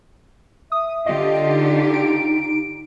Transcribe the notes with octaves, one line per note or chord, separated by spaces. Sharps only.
E5 D#6
D3 F4 G4 D#5
D#4
D7